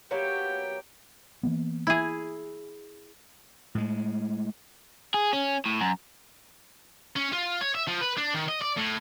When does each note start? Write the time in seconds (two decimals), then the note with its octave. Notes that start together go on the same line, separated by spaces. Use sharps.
0.11 F#3 A#3 B3 G4 G5
1.43 E3 A#3 B3
1.87 E4 G#4
3.75 A2 G#3
5.14 G#4
5.33 C#4
5.66 A2
5.81 F#2
7.16 C#4
7.32 F4
7.61 C#5
7.75 E5
7.87 F3
8.01 B4
8.18 D4
8.34 D#3
8.49 D#5
8.62 D5
8.78 A2